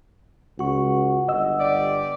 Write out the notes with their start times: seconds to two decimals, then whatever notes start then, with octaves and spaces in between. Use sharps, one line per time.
0.59 C#2 F#4 F#5 C#6
1.28 G1 D#5 E6
1.60 G4 D5